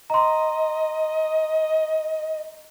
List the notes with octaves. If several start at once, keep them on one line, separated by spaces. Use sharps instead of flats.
D#5 A#5 C6